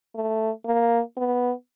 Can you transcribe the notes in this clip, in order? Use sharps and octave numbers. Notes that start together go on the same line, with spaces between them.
A3
A#3
B3